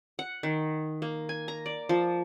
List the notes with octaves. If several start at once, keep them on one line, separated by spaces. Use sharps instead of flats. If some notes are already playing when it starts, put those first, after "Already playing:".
F#5
D#3
A#3
G#5
A#5
D5
F3